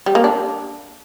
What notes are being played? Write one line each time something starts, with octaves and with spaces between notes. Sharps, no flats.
G3
A#3
D4